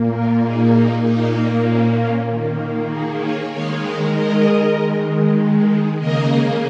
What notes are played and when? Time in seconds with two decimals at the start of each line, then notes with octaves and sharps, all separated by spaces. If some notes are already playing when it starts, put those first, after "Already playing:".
Already playing: A#2 A#3
0.14 F4 A#4
0.44 D#4 G#4
0.75 D#4
1.06 A#2 A#3 D#4
1.67 C#4
1.98 C#4 F4
2.29 D#3 A#3
2.91 D#4 G#4
3.21 G#4 C#5
3.52 D#3 G#3 C#5 F5
3.83 A#4 D#5
4.14 A#4 D#5
4.75 D#3 G#3
5.99 C#3 A#3 A#4 D#5